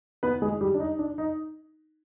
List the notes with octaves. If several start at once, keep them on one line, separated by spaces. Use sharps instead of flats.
B3 B4
G#3 G#4
G3 G4
D4
D#4
D4
D#4